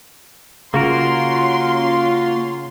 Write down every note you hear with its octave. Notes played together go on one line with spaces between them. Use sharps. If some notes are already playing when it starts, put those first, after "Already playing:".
C#3 A#3 C#4 F4 F#4 A#4 C6